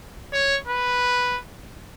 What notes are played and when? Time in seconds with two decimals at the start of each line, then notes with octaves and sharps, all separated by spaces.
0.33 C#5
0.67 B4